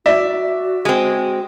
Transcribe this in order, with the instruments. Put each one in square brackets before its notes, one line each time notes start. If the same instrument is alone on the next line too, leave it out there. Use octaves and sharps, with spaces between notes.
[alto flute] F#4 [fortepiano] D5 E5
[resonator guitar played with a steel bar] G#3 C4